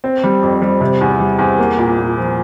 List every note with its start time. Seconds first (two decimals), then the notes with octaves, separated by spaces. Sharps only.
0.04 C4
0.24 G3
0.42 F2
0.62 G3
0.81 C3
1.01 E2
1.20 G3
1.39 E2
1.59 A#3
1.78 A#2
1.97 A#2
2.17 F3